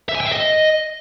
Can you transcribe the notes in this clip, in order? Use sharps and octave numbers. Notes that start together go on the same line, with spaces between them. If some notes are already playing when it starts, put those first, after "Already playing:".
E5
G#5
G5
E5
D#5